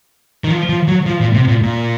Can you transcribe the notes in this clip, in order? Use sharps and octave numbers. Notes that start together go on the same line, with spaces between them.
D#3
F3
F3
F#3
F3
A#2
C3
A#2
A#2